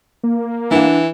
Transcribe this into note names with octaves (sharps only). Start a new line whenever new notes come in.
A#3
E3 D4 F#5